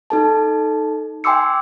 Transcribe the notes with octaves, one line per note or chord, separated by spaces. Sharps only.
D#4 A4 A5
G5 G#5 C6 D6 E6 C#7